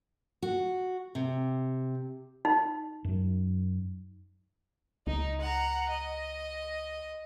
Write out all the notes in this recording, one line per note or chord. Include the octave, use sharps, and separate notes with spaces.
F#4
C3
D#4
F#2 F#3
C#2 D#4
F#5 A#5
D#5